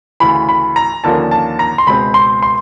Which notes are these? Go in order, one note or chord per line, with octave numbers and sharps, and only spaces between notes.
D2 C#3 E3 B5
B5
A#5
D#2 D3 F3 A#3 C#4 A5
A5
A#5
C6
C#2 B2 G#3 C4 B5
C6
C6